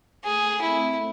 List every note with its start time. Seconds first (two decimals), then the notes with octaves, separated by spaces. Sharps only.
0.24 A3 G#4
0.61 C4 E4